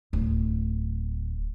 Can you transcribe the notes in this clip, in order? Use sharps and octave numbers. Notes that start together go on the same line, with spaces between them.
D1